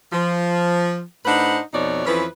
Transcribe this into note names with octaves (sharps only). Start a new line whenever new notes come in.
F3
A2 D4 D#4 B4 C5 F#5
F2 B2 F3 D#4 C#5 D5
F2 E3 F3 C#4 B4